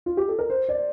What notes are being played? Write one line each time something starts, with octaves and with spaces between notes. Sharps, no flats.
F4
G4
A4
A#4
C5
D5